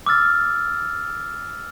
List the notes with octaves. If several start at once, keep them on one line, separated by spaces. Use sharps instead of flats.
D6 E6 F6 A6